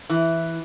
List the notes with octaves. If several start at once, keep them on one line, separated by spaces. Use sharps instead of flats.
E3